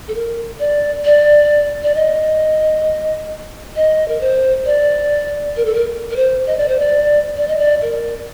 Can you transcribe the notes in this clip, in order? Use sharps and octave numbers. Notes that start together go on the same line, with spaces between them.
A4
A#4
D5
D5
D5
D#5
D#5
A#4
C5
D5
A#4
A4
A#4
A#4
C5
D#5
D5
C5
D5
D5
D#5
D5
A#4